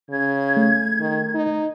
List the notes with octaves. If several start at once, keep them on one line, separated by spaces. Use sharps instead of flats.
C#3 G#6
A3
D#3
D#4